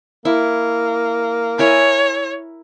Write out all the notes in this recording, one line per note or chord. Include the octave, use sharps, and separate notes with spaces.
A#3 E4
E4 A#4 C#5 G#5